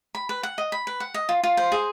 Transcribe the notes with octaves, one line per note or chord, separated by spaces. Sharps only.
B5
B4
F#5
D#5
B5
B4
F#5
D#5
F4
F4
C5
G#4